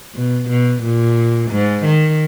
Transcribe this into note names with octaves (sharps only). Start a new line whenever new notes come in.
B2
B2
A#2
G#2
D#3